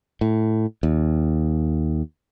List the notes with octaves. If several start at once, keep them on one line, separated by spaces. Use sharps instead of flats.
A2
D#2